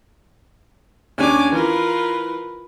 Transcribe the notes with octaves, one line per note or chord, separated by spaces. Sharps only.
D#2 C#4 D4 G#5 D6
E3 F4 A#4 B4